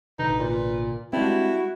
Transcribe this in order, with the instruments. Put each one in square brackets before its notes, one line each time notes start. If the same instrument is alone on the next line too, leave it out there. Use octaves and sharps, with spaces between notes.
[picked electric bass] A1 B2 D3 [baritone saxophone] D#4 [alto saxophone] B4
[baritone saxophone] A#2
[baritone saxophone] G2 [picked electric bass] G#3 C4 [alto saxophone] E4 [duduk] F#4